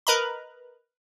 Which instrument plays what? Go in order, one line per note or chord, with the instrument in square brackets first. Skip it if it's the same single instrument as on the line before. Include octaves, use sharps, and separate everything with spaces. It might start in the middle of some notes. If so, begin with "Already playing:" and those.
[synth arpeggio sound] A#4 B4 D#5 A#5 B5